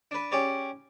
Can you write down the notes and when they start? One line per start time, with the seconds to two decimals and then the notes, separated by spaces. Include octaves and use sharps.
0.11 D4 B4
0.32 C#4 G4 G#4 C#5 D5